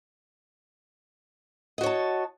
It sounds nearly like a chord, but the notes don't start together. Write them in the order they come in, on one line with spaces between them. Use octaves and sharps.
D#5 F#4 C#5 A5